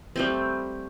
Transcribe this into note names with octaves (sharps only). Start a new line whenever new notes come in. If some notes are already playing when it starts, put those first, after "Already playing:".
G3 A3 C4